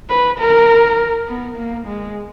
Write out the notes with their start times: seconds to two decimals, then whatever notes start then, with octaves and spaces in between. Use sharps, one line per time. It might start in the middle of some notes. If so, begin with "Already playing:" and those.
0.10 B4
0.40 A#4
1.28 B3
1.57 A#3
1.87 G#3